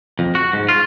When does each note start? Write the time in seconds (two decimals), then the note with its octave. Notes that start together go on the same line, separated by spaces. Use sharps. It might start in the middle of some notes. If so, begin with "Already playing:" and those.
0.19 F2
0.35 F#4
0.53 G#2
0.69 F4